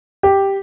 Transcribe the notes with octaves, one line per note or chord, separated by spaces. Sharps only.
G4